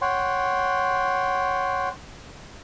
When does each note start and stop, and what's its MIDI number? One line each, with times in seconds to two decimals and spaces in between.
0.02 1.89 73
0.02 1.89 78
0.02 1.89 79
0.02 1.89 84